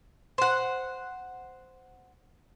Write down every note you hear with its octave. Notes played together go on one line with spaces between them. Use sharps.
C5 F#5